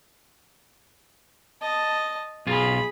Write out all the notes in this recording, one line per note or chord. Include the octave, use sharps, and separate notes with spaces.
D#5 A5
B1 F4 G#4 B5